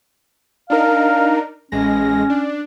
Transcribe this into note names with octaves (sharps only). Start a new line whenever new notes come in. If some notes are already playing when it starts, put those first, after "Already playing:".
D4 D#4 A#4 F5
A1 G#3 C#4 A#6
D4